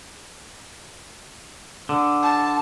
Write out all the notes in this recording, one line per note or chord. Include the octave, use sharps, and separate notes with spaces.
D3
A5